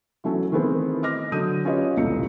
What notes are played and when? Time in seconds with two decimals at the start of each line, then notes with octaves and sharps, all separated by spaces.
0.24 E3 F#3 A3 C#4 A4
0.52 D#3 E3 A3 B3 C4 G#4
1.03 D#5 D6 F6 A#6
1.32 D3 F#3 D#6 G6 D#7
1.65 C#4 F4 G4 B4 C#5 D#5
1.97 E1 C2 A#2 C#3 A3 C#7